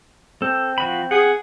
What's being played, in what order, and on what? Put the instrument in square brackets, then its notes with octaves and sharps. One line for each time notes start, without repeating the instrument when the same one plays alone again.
[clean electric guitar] C4 [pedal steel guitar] A4
[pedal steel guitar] F3 F#4 B5
[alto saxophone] G#4 [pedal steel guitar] F#5